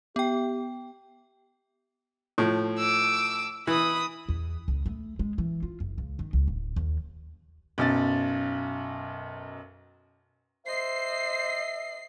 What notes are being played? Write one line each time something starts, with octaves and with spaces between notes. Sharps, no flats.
B3 G4 G5
A2 F3
D6 E6
E3 B5 D#6
E2
C#2
A3
G#3
E3
F4
F#1
C#2
D#3
C#2
D1
D#2
B1 F#2 A6
C5 D#5 E5 C7